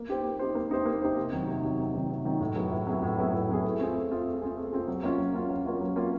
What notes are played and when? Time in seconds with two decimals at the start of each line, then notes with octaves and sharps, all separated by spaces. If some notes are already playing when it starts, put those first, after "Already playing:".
Already playing: A#3
0.09 D#4 G4 C5
0.24 A#3
0.39 D#4 G4 C5
0.55 A#3
0.71 D#4 G4 C5
0.86 A#3
1.02 D#4 G4 C5
1.17 C3
1.33 D#3 F#3
1.48 C3
1.63 D#3 F#3
1.78 C3
1.95 D#3 F#3
2.09 C3
2.25 D#3 F#3
2.40 A2
2.56 F#3 B3 E4 G#4
2.71 A2
2.87 F#3 B3 E4 G#4
3.02 A2
3.17 F#3 B3 E4 G#4
3.34 A2
3.49 F#3 B3 E4 G#4
3.64 A3
3.79 C4 F4 G#4
3.95 A3
4.11 C4 F4 G#4
4.27 A3
4.42 C4 F4 G#4
4.57 A3
4.72 C4 F4 G#4
4.88 F#3
5.03 A#3 C#4 F4
5.18 F#3
5.34 A#3 C#4 F4
5.49 F#3
5.66 A#3 C#4 F4
5.81 F#3
5.96 A#3 C#4 F4